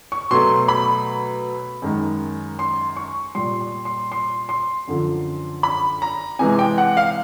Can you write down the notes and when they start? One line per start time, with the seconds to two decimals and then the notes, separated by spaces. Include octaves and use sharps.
0.12 C#6
0.31 B2 F#3 A3 C6
0.68 B5
1.82 F#2 D#3 G#3
2.59 C6
2.97 C#6
3.35 A#2 G3 C6
3.61 C6
3.85 C6
4.12 C6
4.49 C6
4.88 F#2 D3 F3
5.63 B5
6.02 A#5
6.39 C3 E3 G#3 G#5
6.59 G5
6.78 F#5
6.97 F5